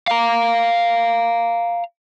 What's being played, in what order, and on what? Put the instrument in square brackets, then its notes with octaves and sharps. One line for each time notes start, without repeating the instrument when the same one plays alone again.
[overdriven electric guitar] F5 A#5